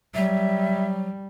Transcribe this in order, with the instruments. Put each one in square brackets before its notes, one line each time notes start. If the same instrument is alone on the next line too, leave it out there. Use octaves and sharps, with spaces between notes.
[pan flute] F#3 [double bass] G3 [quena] E5